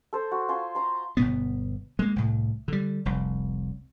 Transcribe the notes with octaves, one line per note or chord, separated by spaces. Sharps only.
A4 C5
F#4
F4 G#5 C6
A#5 C6
G1 B2 B3
G#3 A#3
C2 A2
D3 G3
F1 C2